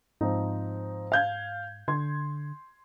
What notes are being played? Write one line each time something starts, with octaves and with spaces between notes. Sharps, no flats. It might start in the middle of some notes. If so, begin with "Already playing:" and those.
G#2 F3 C4 D#4
F5 G6 G#6
D3 C6 G#6